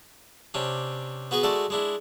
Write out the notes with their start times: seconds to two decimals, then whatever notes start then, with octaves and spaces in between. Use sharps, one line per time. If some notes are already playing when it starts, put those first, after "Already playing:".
0.54 C3 C#4 D4
1.31 B3 F#4 G#4 B4
1.43 G#3 A3 F#4 A4 D5
1.70 G#3 D4 E4